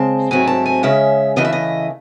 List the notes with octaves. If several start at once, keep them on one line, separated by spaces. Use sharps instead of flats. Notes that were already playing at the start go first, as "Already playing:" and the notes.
Already playing: C#3 G#3 C4 A5
G#2 F#3 A3 C4 G#5
A5
G#5
C#3 G#3 C#4 E5
C#3 E3 A3 D#5
E5
D#5